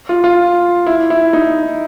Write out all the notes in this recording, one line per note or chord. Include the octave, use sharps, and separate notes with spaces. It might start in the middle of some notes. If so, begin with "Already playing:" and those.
F4
F4
E4
E4
D#4